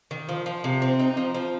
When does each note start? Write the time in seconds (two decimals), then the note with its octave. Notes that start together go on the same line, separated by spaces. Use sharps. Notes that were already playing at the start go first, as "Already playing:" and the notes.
0.11 D#3
0.29 F3
0.46 F3
0.64 C3
0.82 C4
1.00 D#4
1.17 F3
1.34 F3